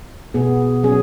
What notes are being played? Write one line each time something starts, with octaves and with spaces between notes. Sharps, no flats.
B2 B3 G#4
F#3 C#4 G#4